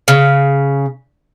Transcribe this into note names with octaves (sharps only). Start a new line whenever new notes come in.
C#3